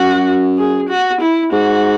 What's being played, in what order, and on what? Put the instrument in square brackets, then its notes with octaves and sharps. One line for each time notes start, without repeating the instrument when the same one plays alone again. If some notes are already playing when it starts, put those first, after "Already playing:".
Already playing: [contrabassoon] F#2 [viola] F#4
[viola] G#4
F#4
E4
[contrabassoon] G#2 [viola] F#4